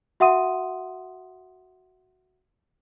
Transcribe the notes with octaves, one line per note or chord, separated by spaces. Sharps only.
F#4 E5 F#5 C6 D#6 D#7